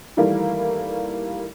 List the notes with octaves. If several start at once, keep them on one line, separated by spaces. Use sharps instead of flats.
D#3 E3 G3 A3 A#3